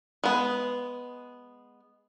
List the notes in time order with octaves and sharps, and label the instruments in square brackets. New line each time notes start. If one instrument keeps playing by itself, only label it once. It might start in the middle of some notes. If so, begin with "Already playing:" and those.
[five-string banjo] G#3 B3